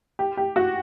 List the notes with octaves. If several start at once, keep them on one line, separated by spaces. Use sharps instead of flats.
G4
G4
F#4